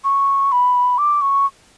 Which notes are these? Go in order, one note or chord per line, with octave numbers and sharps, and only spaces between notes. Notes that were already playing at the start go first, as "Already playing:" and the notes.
C#6
B5
D6
C#6